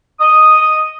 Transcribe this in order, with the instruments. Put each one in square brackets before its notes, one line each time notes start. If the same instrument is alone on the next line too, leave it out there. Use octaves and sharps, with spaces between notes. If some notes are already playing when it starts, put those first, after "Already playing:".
[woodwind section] D#5 D#6